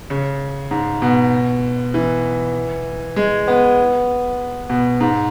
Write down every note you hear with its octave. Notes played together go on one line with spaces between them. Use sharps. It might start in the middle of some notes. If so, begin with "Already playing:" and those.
C#3
G#2
B2
E3
G#3
B3
B2
G#2